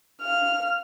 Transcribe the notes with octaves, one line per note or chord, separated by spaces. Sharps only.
F5 F6